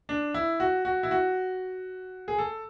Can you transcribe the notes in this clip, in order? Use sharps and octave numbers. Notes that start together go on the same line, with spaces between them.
D4
E4
F#4
F#4
E4
F#4
G#4
A4